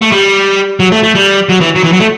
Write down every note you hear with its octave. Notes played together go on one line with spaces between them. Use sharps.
A3
G3
F#3
A3
A3
G3
F#3
E3
F#3
E3
F#3
A3